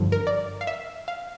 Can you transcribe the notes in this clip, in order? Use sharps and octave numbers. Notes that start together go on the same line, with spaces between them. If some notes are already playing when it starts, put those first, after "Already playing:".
Already playing: G2 D3 F3
A#4
D5
F5
E5
F5